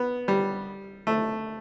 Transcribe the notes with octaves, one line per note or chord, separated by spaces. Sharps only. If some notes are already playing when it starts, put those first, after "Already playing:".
Already playing: B3
G3
A3